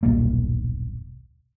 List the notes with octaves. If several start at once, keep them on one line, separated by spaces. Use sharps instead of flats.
D#1 B1 G2 A#3